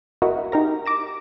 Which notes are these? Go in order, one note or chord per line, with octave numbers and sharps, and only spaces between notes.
E4 F#4 A#4 D#5
D#4 G4 A#4 A#6
D6 A#6 E7